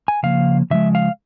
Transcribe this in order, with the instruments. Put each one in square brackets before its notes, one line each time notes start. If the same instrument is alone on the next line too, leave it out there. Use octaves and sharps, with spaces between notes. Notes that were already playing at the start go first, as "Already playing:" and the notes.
[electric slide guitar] G#5
C#3 F3 A#3 F5
C#3 F3 G#3 E5
F5